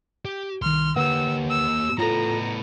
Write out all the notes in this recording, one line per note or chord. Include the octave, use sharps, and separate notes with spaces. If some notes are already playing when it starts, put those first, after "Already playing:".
G4
C2 D#3 C6 F6
D3 A#3 G4 B4 F#5 E6
E6
A2 B3 F4 A4 A#5